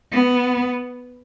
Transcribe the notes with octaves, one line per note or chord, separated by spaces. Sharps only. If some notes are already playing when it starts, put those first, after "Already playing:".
B3